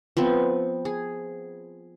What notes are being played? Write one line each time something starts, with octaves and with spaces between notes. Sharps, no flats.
F3 B3 C4
G#4